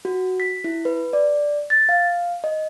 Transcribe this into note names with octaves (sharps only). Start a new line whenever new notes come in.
F#4
B6
E4
B4
D5
A6
F5
D#5